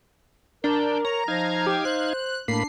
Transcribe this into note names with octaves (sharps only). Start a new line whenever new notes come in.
D4 A#4 G6
C#5 A#5
F3 D#4 F5 G#6
G4
C5 F#6
A2 A#3 D4 B5 C7